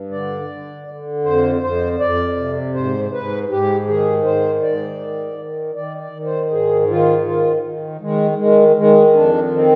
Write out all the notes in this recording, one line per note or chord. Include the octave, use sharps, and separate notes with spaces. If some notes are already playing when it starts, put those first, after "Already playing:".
Already playing: G2
D3 D5
D3
D3
F2 C5
F2 C5
F2 D5
C3
G#2 C5
G#2 B4
G#2 G4
D#3 G#4
G#2 C5
G#2 D5
D#3
D#3
D#3 D5
D5
D#3
C5
G#2 G#4
D#3 F4
D#3 F4
D#3
D#3 G#3
D#3 G#3
D#3 G#3
F2 D4
D#3 C4